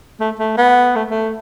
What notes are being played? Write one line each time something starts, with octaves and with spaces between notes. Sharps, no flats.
A3
A3
B3
A3
A3